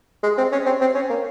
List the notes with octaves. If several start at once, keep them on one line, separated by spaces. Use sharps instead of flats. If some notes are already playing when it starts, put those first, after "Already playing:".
G#3
C4
C#4
C4
C4
C#4
A#3